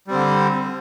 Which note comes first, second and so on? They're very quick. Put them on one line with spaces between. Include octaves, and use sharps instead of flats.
G3 C4 D3